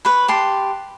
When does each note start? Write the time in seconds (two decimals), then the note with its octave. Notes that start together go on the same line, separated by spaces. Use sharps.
0.05 B4 C#5 B5
0.28 G4 A5 C6